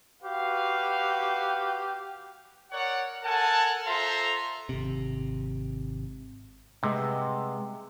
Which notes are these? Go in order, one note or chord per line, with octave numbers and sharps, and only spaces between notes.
F#4 G4 B4 F5
A#4 C#5 D5 F#5
A4 A#4 F#5 G#5 A5
F4 A4 C5 E5 A#5 C6
G#1 C3
C3 G3 G#3 B3